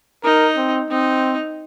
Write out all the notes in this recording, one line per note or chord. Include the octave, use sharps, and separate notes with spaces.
D#4 A#4
C4
C4 D#4